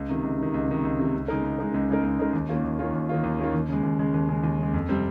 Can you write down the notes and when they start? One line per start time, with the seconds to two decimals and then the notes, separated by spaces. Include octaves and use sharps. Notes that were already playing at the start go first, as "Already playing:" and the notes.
Already playing: C#2
0.09 C3 D#3
0.23 C#2
0.38 C3 D#3
0.54 C#2
0.68 C3 D#3
0.83 C#2
0.99 C3 D#3
1.14 C#2
1.28 C#3 G#3 D#4 A#4
1.43 C#2
1.59 C#3 G#3 D#4 A#4
1.74 C#2
1.89 C#3 G#3 D#4 A#4
2.03 C#2
2.19 C#3 G#3 D#4 A#4
2.33 D#2
2.49 D#3 A#3 C#4 F4
2.64 D#2
2.79 D#3 A#3 C#4 F4
2.93 D#2
3.09 D#3 A#3 C#4 F4
3.24 D#2
3.39 D#3 A#3 C#4 F4
3.54 D#2
3.69 C#3 G#3
3.83 D#2
3.99 C#3 G#3
4.14 D#2
4.29 C#3 G#3
4.44 D#2
4.59 C#3 G#3
4.74 F2
4.89 C3 G3 C4